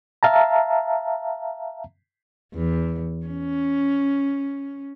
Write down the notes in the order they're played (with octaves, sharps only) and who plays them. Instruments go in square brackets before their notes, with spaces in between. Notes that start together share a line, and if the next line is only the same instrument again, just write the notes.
[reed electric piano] E5 F5 A5 A#5
[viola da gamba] E2
C#4